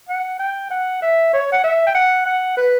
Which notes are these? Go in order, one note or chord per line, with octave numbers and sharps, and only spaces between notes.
F#5
G5
F#5
E5
C#5
F#5
E5
G5
F#5
F#5
B4